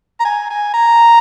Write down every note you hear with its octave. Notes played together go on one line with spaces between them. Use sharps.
A#5
G#5
G#5
A#5